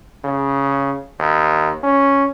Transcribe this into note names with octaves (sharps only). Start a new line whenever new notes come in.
C#3
D#2
C#4